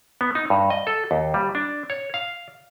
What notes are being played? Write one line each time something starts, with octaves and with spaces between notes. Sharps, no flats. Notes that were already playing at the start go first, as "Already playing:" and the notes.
B3
D#4
G2
D#5
A4
D#2
G3
D4
C#5
F5